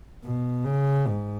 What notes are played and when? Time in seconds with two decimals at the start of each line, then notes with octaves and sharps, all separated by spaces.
0.24 B2
0.65 C#3
1.06 G#2